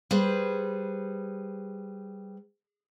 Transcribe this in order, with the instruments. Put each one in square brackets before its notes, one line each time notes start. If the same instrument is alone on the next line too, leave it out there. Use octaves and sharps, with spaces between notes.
[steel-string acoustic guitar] G3 G#4 B4 C5